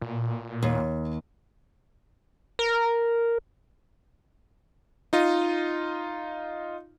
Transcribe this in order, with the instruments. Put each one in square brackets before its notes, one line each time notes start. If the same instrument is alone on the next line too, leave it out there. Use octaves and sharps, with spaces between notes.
[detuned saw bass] A#2
[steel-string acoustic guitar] D#2
[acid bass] A#4
[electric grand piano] D#4 F4 D#5